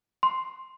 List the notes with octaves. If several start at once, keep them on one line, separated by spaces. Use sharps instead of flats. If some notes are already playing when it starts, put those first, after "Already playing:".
C6